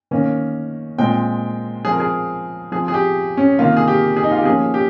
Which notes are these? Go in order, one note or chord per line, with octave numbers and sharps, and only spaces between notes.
D#3 A#3 C#4
A#2 G#3 C4 G5
F3 C4 G#4
A#4
G#4
F3 C4 G#4
G#4
G4
C#4
C3 D#3 A#3 F4
G#4
G4
G#4
D#4
F4
G4
F3 A#3 C#4 G#4
G4